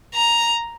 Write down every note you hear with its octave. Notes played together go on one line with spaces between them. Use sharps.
A#5